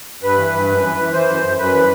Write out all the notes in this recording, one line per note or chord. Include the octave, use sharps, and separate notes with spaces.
G2 B4
E3
G2
F#2
E3
E3
E3 C5
F#2
F#2
F#2 B4
E3